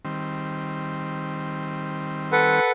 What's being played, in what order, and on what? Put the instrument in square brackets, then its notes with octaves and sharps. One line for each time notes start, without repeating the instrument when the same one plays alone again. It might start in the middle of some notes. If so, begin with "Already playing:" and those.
[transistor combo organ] D#3 G3 C4
[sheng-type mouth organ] A4 B4 F#5